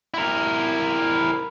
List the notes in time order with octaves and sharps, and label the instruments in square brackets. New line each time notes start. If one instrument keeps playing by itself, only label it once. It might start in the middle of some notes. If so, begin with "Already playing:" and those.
[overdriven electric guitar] E4 A#4